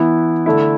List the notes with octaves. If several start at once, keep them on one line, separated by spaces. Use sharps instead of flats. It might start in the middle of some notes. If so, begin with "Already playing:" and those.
Already playing: E3 B3 E4
D3 A3 E4